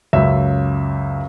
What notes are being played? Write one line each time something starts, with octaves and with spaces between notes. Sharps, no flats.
C#2 F#2 E5